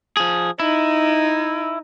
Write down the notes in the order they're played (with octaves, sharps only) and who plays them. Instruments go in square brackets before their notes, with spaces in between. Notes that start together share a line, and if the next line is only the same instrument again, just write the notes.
[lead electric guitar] F3 G#4
[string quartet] D#4 [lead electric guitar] E4